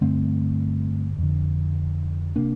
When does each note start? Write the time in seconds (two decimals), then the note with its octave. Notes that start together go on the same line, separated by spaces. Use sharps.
0.01 G2 D3 A3 C4
1.18 F2 D3
2.36 C3 A#3 D4